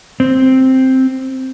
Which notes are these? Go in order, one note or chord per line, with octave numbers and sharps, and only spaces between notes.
C4